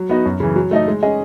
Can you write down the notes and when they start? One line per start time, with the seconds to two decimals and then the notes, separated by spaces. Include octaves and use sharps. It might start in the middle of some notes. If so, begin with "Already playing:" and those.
Already playing: F#3
0.09 B3 D#4 F#4
0.26 F#2
0.40 C#3 E3
0.56 F#3
0.71 A3 D#4 A4 D#5
0.88 G#3
1.03 C#4 G#4 D#5